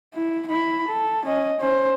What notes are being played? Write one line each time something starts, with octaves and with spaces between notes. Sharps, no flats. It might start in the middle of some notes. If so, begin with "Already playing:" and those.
E4
E4 B5
A4
C#4 D#5
C#4 C5